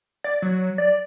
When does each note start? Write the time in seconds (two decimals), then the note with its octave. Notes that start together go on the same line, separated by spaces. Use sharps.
0.24 D5
0.42 F#3
0.78 D5